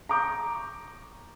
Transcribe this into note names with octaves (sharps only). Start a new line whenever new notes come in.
A#5 C#6 D6 G6